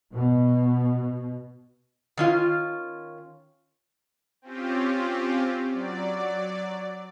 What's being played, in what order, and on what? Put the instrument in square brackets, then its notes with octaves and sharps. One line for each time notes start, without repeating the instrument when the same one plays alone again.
[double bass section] B2
[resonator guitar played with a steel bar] D#3 C#4 F4
[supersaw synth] C4 C#4 F4 G4
F#3 D5